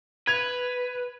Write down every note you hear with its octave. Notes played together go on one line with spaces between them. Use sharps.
B4 G#6 F7